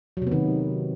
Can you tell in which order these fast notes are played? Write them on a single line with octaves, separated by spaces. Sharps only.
F#3 C3 B3 D#3